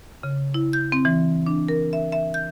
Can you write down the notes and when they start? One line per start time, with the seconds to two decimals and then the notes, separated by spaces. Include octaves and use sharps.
0.23 C#3
0.54 E4
0.73 G6
0.92 C4
1.05 E3
1.47 D4
1.68 A#4
1.93 E5
2.12 E5
2.34 G6